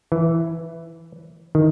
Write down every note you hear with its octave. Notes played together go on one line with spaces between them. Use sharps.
E3
D#3